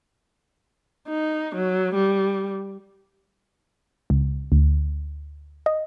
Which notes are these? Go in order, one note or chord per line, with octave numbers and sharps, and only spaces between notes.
D#4
F#3
G3
C#2
D2
D#5